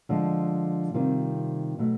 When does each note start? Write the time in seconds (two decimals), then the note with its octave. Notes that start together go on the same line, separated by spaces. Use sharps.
0.09 D3 F3 G#3
0.94 C3 D#3 G3 C4 F4
1.79 B2 F#3 A3